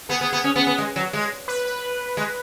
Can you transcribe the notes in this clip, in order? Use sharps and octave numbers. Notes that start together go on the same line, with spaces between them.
B3 G#4
B3
B3
C#4
B3
B3
G#3
F#3
G#3
B4
B4
G#3